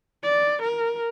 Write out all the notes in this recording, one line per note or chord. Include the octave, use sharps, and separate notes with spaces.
D5
A#4